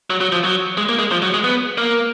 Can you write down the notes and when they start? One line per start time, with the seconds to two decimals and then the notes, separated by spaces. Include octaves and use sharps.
0.10 F#3
0.21 F#3
0.32 F3
0.44 F#3
0.77 G#3
0.89 A#3
0.99 G#3
1.11 F3
1.22 F#3
1.34 G#3
1.44 B3
1.78 A#3